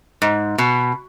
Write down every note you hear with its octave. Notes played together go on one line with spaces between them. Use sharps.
G#2
B2